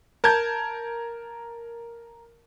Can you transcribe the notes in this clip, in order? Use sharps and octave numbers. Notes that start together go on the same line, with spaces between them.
A#4 A5 G6 G#6